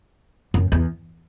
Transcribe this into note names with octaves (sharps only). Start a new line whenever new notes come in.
F#2
E2